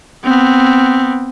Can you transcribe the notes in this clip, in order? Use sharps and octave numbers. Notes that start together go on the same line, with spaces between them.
B3 C4